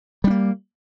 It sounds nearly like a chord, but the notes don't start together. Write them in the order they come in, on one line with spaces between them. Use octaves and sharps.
G3 D4 A#3